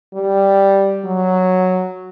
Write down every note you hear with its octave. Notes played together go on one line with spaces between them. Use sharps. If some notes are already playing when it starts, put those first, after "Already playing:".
G3
F#3